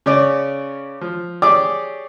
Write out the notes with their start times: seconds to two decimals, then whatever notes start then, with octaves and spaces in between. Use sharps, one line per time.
0.06 C#3 C#4 C#5 D5
1.01 F3
1.42 G4 G#4 C#5 D5 D6 E6